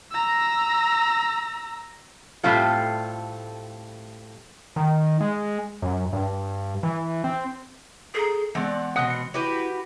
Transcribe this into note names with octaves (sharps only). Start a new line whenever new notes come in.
A#5 E6
A2 G3 A3 C4 F4 A4
D#3
G#3
F#2
G2
E3
C4
G#4 A4 A#5
E3 G#3 B3 C4 D5 F#5
B2 C4 F#5 D#6 F#6
C#7
E4 F#4 G4 B4